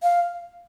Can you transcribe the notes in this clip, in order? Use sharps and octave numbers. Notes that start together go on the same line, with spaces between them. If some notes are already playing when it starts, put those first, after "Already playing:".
F5